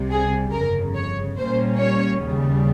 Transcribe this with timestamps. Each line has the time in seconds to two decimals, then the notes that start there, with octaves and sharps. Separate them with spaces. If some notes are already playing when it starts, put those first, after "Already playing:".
Already playing: C2 C3 G3
0.11 G#4
0.53 G1 F2 C#3 A#4
0.95 C#5
1.37 A#2 G3 A#3 C#4 C5
1.80 C#5
2.22 D#2 C#3 G3